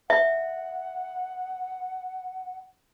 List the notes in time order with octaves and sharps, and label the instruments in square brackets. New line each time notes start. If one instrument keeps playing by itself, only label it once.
[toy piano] E5 [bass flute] F#5